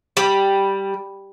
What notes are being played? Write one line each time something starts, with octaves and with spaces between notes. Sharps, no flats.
G3